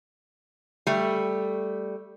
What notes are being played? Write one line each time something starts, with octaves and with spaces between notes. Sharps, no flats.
G3 A3